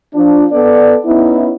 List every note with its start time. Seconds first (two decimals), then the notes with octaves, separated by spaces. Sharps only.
0.14 F3 D4
0.52 B3 A4 D5
1.05 B3 C#4 D#4 E4